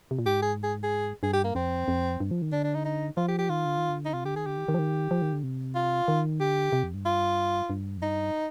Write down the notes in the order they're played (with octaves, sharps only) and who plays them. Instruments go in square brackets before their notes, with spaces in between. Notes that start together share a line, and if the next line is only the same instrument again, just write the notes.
[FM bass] C3
A#2
[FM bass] G#2 [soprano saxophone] G4
[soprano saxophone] G#4
G#4
G#4
[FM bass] G2 [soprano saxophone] G#4
[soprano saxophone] G4
A#3
[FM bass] F2 [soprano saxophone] C4
[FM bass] F2
G2
F3
D#3
[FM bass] D3 [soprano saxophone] D4
[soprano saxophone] D4
D#4
D#4
[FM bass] F3 [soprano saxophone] F4
[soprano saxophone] G4
G4
[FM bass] D#3 [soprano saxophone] F4
[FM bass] D3
D#3
D3
[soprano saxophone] D#4
[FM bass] C3 [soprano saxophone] F4
[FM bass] D3 [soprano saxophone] G4
[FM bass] D#3 [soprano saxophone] G#4
[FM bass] D3 [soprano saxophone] G4
[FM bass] D#3
D#3
F3
D#3
F3
D#3
D3
C3
[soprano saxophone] F4
[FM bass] D#3
[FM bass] D3 [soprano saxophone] G4
[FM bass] C3
F2
G2
[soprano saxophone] F4
[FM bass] G2
F2
[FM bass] G2 [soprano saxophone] D#4